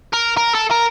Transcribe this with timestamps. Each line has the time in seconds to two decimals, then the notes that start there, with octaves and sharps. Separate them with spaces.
0.13 A#4
0.37 A#4
0.54 A4
0.71 A#4